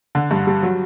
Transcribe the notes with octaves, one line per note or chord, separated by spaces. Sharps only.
D3
G2
G3
F#3